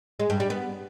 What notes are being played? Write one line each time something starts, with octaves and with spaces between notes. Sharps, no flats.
G#3
G2
G3
B3